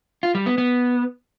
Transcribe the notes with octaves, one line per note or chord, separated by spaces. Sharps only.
F4
G3
B3
B3